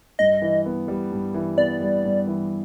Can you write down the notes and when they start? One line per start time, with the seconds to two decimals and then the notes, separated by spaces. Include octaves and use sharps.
0.19 G2 D#5
0.42 E3
0.66 B3
0.88 G3
1.12 G2
1.34 E3
1.57 B3 D5
1.81 G3
2.04 G2
2.27 E3